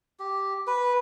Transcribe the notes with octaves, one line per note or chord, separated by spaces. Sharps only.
G4
B4